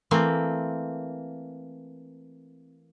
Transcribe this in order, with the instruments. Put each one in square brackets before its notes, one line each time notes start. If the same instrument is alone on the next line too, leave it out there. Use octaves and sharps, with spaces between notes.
[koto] E3 A3 A#3 C4